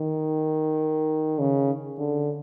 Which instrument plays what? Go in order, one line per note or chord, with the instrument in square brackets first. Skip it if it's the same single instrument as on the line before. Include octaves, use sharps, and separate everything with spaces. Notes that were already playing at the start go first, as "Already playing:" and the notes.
Already playing: [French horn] D#3
C#3
D3